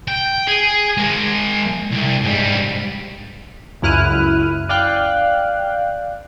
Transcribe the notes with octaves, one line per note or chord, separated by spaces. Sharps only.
G5
G#4
G#3 A#4
C2
G#2 G3
C#2 F#2 E4 F6 F#6 D#7
D5 F5 G5 F#6